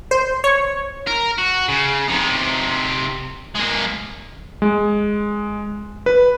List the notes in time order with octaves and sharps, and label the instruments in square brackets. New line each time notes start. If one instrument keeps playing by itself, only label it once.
[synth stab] C5
C#5
[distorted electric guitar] A#4
F#4
C#3
C3 D#4
G#3 A#3
[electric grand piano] G#3
B4